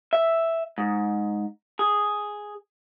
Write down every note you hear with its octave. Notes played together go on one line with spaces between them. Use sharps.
E5
G#2
G#4